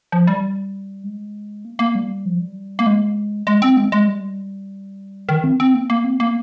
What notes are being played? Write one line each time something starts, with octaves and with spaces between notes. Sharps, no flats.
F3
G3
G#3
A#3
A#3
G3
F3
G3
A#3
G#3
G#3
C4
G#3
G#3
G3
D#3
C4
C4
A#3
A#3
C4
A#3